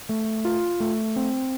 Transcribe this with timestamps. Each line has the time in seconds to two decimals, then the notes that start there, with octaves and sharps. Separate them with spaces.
0.09 A3
0.45 F4
0.80 A3
1.16 C4